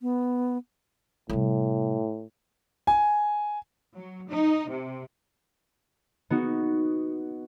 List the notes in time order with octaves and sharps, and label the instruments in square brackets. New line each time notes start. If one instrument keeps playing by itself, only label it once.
[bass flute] B3
[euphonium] A2 [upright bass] C3 G3
[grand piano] G#5
[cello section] F#3
D#4
C3
[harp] B3 D#4 F#4